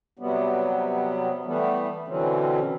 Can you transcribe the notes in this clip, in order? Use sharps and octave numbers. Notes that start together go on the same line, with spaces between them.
C3 F#3 G3 B3
E3 G3 A3 B3
B2 D3 E3 F#3 C4 C#4